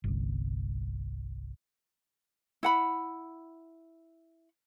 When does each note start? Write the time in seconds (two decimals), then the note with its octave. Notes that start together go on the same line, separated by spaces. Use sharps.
0.04 G1 C2
2.63 E4 F#5 B5